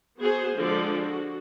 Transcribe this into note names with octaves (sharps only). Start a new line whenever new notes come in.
B3 F#4 G#4 C5
D3 F3 G#3 D5
F#4